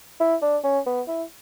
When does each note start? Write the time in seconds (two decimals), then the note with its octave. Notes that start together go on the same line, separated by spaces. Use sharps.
0.20 E4
0.42 D4
0.64 C#4
0.86 B3
1.08 E4